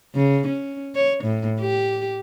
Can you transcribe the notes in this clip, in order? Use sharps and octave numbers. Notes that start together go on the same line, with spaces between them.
C#3
C#4
C#5
A2
G4